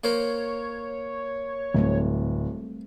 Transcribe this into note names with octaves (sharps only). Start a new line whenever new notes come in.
A#3 A#4 C5 C#5
D1 G3 A3 C4